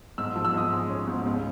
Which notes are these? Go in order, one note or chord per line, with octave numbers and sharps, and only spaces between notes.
G#2 E6
F3
E6
G#2 D#6
G#3
C#4
G#2
C#2